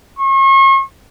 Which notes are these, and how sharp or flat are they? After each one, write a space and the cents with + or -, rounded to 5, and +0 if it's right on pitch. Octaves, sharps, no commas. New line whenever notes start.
C#6 -40